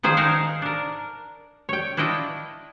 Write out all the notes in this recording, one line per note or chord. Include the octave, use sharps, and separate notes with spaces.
D#3 F3 G#4 C5 G5
D#4 G#4 A#4 C5 F5 F#5
D4 A#4
C#5 G5
D4 E4 F4 D#5 G5